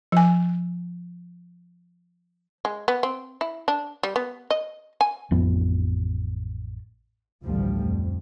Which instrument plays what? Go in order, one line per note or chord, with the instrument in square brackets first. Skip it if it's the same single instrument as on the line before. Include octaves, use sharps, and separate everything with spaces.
[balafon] F3 G#5
[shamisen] G#3
B3
C4
E4
D4
G3
B3
D#5
G#5
[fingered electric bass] A1 F2 F3 B3
[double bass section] A1 D2 G2 F3 G3
F2